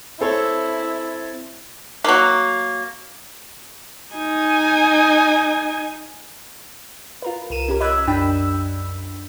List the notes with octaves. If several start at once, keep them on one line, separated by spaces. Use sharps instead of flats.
C4 E4 A4 C#5
F#3 A#3
D#4 G#5
F4 A#4 B4
C2 A#4 D#7 E7
C#4 G4 A#4
D#5 B5 D6 E6 F#6 G#6
F#2 D4 G5 B5 E6